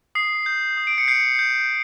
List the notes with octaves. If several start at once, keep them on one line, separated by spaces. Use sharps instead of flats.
D#6 C7
G6
D#6
D7
C#7
G6 C7
G6